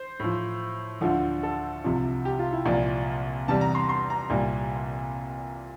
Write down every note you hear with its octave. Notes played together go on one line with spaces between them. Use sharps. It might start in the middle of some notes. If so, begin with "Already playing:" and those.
Already playing: C5
A2 F3
D2 D3 F3
A4
C2 C3 F3
G4
F4
E4
C2 A#2 F3 D5
E2 C3 G3 A5
A#5
C6
C6
A#5
C2 A#2 G3